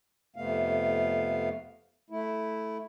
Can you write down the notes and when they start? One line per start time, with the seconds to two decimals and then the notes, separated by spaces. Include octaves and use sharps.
0.36 F2 C3 A3 B3 F5
2.10 A3 E4